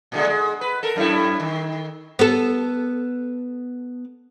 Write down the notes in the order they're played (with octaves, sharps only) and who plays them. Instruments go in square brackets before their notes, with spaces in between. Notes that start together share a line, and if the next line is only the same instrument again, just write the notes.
[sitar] A#2 D3 G#3
G#3
B4
A4 A#4
F#2 A2 E4
D#3
[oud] B3 A4